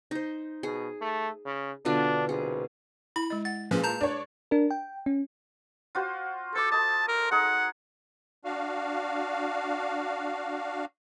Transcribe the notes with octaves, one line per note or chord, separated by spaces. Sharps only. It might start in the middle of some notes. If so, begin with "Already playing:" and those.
D#4 C5
B2 G#4
A3
C#3
B2 D3 D4 F4
C2 G#4
E4 B5
G#3 D#5
F#5 A6
A#2 F3 C#4 G#4 B4
A5 A#5 G6
D4 C#5
D4 A#4
G5
C#4
F4 F#4 C5
A4 C5 D6
A4 D#5 A5
A#4
D#4 G#4 F#5
D4 F#4 F5